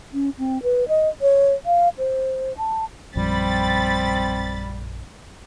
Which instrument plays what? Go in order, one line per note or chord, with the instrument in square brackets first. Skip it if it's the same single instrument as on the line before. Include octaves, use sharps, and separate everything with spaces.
[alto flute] C#4
C4
B4
D#5
C#5
F5
C5
A5
[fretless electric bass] A#1 F#2 F3 [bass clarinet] G3 [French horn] C4 [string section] B5 A6